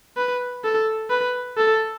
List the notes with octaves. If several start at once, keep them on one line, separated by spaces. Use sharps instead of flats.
B4
A4
B4
A4